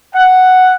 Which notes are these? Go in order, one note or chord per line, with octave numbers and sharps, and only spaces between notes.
F#5